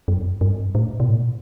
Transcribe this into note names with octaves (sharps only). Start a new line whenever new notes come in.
F#2
G2
A2
B2
A2